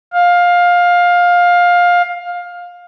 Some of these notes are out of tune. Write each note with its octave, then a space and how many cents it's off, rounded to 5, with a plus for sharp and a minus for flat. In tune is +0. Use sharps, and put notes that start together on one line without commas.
F5 +15